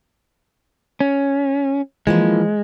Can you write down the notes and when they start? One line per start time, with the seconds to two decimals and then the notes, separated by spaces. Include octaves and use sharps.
1.00 C#4
2.07 E3 F3 G#3 A#3